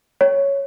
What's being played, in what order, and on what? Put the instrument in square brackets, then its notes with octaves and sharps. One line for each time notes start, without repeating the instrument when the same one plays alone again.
[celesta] C#5